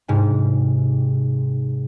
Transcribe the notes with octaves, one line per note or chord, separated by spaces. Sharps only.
G#2 C3